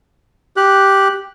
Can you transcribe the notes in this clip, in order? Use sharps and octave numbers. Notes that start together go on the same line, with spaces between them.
G4 F#6